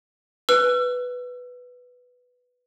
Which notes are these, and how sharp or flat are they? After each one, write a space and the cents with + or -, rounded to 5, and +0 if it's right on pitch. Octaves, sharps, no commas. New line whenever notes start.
B4 +0 E6 +35